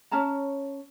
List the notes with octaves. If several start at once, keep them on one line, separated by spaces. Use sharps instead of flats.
C#4 C#5 A5 A#5